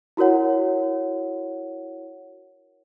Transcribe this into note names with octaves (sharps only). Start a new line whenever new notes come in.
E4 F#4 A#4 C#5 F#5